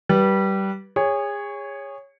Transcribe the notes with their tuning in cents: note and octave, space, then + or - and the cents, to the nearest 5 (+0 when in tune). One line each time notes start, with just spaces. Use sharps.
G3 -15 B4 -25
G#4 -30 C#5 +0